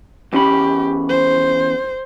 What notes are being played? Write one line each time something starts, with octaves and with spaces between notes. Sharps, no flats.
E2 C#4 G4 B5
C5